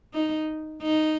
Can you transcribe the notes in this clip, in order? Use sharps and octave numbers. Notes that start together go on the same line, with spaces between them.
D#4
D#4